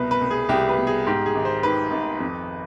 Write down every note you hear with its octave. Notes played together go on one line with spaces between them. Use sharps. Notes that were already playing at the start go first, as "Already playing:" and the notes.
Already playing: C2 B2 B4
B4
C2
G#4
C2 G4
B4
B2
G#4
G#2 G4
G#4
G#1
C5
D#3 B4
G#1
F2